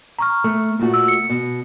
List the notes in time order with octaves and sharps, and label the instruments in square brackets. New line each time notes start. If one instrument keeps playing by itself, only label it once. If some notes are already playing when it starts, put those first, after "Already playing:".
[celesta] A#5 C#6 F6
[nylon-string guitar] A3
A#2 A3 F#4
[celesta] E6
C#7
[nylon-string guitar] B2